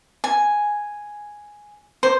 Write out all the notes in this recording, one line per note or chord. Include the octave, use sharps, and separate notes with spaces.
G#5
C5